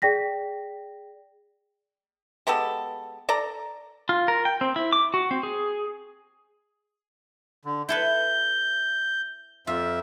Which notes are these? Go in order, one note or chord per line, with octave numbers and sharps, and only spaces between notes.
G#4 D5 G5 A#6 B6
G#3 B3 G4 A4
A4 D5 A#5
F4
A#4
G5
C4
E4
D6
F#4
C4
G#4
D3
E4 A4 B4 G6
F2 F4 E5